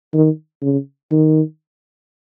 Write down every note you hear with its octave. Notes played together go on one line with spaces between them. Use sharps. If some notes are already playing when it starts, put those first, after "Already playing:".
D#3
C#3
D#3